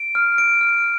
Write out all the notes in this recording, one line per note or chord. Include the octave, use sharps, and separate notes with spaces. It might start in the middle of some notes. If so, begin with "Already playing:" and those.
Already playing: D7
F6
D7
F6